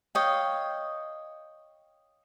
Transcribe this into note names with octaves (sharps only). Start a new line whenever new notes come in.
C#5 D#5 F5 G5